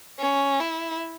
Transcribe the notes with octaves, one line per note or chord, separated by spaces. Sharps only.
C#4
E4